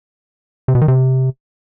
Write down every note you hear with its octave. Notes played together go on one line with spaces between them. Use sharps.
C3
B2
D#3
C3